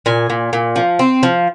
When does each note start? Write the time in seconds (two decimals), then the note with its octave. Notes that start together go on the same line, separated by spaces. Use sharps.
0.06 A#2 G#5
0.30 A#2
0.53 A#2
0.76 F3
0.99 C4
1.23 F3